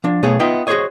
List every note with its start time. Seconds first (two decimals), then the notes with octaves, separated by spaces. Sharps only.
0.04 F3 D4
0.23 B1 B2 A3 B3 G#4 C#5
0.39 B3 D#4 F4 D#5 E5 G5
0.67 F#4 G#4 A4 C5 C#5 D#5